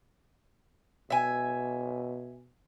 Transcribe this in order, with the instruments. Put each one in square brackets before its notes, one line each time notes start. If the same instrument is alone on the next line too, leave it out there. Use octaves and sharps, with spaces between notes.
[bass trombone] B2 [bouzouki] E5 G#5